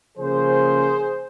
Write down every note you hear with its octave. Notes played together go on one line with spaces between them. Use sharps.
C#3 F3 A#3 C#4 G#4 C5